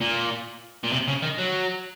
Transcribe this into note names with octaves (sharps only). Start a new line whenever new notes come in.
A#2
A#2
C3
C#3
D#3
F#3